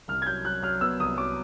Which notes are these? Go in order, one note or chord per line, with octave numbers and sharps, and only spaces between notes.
C2 F6
G#6
F#3 G6
F#3 F#6
F#3 F6
B3 E6
C2 D#6
F#3 D6